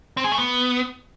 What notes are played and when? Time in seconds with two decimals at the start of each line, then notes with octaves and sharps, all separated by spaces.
0.17 C4
0.24 G#4
0.32 A3
0.39 B3